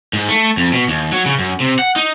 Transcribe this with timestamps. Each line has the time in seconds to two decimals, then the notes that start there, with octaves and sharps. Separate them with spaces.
0.13 G#2
0.29 A3
0.57 F2
0.73 B2
0.88 D#2
1.12 F#3
1.26 C#3
1.39 F#2
1.60 C3
1.79 F#5
1.96 D#4